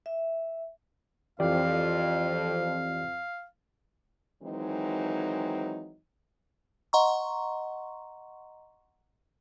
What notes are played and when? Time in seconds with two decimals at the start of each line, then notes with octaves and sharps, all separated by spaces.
0.06 E5
1.40 F2 E3 G4 D5 F5
4.42 D#3 E3 F#3 G#3 C4 D#4
6.93 D#5 F#5 A#5 C6 C#6